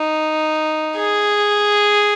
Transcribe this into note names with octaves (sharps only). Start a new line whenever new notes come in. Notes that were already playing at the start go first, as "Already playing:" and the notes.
Already playing: D#4
G#4